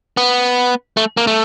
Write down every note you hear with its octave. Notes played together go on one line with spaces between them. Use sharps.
B3
A3
A#3
A3